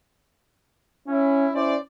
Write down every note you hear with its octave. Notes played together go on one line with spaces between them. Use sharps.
C#4 E4
C#4 E4 C5 D5